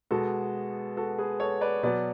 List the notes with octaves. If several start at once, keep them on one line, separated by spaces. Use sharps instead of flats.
B2 G#3 B3 F#4 A4
F#4 A4
G#4 B4
A4 C#5
B4 D5
B2 F#3 B3 B4 D5